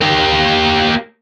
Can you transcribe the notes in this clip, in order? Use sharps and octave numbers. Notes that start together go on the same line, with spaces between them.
A#3 G4